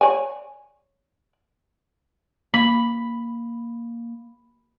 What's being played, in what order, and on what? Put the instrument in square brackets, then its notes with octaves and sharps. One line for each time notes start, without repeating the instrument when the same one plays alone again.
[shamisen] C#5 D5 G#5
[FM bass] A#3 [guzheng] B5